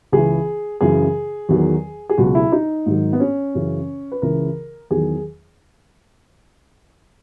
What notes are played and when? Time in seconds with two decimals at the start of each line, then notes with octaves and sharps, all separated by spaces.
0.12 C#2 C#3 E3 G#4
0.81 F#2 C#3 E3 G#4
1.49 E2 D#3 F#3
2.09 G#4
2.18 C#2 B2 F#3 F#4
2.35 E4
2.52 D#4
2.86 G#2 D#3 F#3
3.13 B3
3.20 C#4
3.55 F#2 C#3 E3
4.12 B4
4.22 C#2 C#3 E3 A#4
4.90 E2 D#3 F#3 G#4